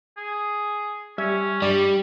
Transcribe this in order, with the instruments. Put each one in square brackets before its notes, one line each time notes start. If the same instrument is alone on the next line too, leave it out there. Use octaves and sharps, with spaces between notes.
[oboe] G#4
[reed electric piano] G3 E5 G#6 [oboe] C#4
[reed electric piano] G2 D5 [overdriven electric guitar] G3